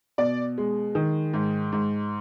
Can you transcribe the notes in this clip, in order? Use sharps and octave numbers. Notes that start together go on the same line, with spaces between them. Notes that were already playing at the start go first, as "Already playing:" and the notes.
B2 D5
G#3
D#3
G#2
G#2